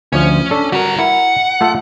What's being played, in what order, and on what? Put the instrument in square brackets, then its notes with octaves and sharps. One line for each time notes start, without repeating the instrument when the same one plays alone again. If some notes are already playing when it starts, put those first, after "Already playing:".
[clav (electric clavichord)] D2 F3 [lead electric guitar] C#4
[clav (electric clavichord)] D4 A4 C#5
[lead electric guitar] G3 A#5 [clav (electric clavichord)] F#4 A#4
[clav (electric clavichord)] E4 A#4 [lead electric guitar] F#5
[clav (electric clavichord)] A3 F4 A4